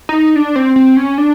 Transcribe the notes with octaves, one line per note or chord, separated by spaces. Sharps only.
D#4
D4
C4
C4
C#4
D4